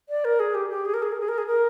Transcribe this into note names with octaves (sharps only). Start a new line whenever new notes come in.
D5
A#4
G#4
G4
G4
G#4
A#4
G#4
A#4
G#4
A#4
G#4
A#4